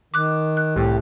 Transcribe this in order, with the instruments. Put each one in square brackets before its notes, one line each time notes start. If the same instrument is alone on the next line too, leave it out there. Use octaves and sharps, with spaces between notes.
[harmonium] D#3 [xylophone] D6 F#6
[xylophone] F#6
[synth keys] C2 A2 [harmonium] G4